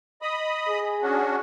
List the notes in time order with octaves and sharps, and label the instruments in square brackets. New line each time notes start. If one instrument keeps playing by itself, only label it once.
[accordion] D#5 B5 D#6
[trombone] G#4
[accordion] C#4 D4 F#4